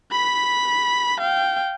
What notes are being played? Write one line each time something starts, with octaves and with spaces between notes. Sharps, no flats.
B5 B6
F5 G5